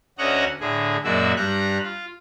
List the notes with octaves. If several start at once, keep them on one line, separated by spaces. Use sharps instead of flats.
D2 C#4 F#4 D#5 F#5 A#5
A2 D3 G#4
F#2 A#2 G#3 F#4 D5 E5
G2 G3 A#5 F#6
F4